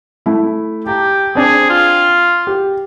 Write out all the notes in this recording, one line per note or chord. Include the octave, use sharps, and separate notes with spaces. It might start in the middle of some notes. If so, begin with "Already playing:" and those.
A3 E4
G4 A5 A#5
C4 D4 G#4
F4
G4